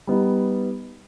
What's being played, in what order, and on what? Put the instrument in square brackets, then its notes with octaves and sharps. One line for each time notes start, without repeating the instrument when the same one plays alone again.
[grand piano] G3 B3 D#4